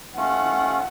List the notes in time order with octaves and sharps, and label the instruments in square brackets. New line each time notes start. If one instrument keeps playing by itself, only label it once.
[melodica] A3 C#4 F4 [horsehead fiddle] F#5